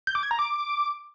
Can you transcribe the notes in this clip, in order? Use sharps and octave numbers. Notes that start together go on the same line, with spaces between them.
G6
D6
G#6
A#5
D6